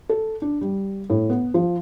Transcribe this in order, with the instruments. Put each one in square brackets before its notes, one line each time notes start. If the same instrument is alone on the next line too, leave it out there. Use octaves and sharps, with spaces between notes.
[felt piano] A4
D4
G3
A2
B3
F3